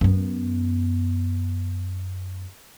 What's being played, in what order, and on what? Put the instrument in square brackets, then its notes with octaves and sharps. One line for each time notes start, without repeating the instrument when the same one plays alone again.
[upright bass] F#2 B3